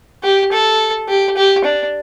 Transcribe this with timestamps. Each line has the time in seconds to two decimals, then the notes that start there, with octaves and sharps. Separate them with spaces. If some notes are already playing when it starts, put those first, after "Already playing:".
0.23 G4
0.52 A4
1.09 G4
1.37 G4
1.64 D4